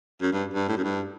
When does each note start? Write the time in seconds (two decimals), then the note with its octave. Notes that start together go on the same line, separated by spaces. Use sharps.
0.22 F#2
0.33 G2
0.53 G2
0.68 A2
0.77 F#2
0.84 G2